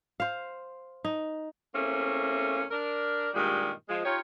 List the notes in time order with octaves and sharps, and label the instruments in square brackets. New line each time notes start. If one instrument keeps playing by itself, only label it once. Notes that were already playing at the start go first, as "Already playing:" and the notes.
[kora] C5 F5
D#4
[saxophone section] E2 A3 A#3 C4 C#4
D4 A#4
G2 A#2 D#3 G3 G#3
F3 G#3
D#4 F4 G4 C#5